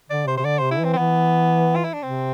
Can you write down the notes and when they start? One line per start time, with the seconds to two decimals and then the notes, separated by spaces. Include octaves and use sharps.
0.10 D3 D5
0.27 C3 C5
0.37 C3 C5
0.45 D3 D5
0.58 C3 C5
0.71 E4
0.79 E3 C4
0.93 C4
0.98 E3 B3
1.75 F4
1.84 E4
1.93 D4
2.02 C3 C4